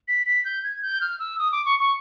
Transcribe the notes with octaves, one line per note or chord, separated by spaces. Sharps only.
B6
B6
G6
G#6
G6
F6
E6
D#6
D6
C#6
C#6